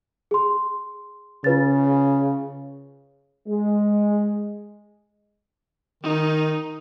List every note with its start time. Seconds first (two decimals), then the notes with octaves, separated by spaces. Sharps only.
0.31 G#4 C6
1.44 C#3 F4 B4 A6
3.48 G#3
6.03 D#3 D#4